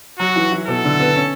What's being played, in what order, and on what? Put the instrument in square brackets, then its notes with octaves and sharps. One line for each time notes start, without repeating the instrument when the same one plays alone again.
[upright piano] F#3 [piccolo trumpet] F#4
[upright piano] E3
E3
[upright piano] B2 [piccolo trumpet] A4
[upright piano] D3
B3
C#4